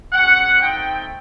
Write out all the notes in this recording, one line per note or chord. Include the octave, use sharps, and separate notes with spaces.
G#3 C#4 F#4 F#5
A3 C4 D#4 G5